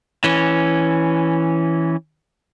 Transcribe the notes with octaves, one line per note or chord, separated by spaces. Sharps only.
E3 C#4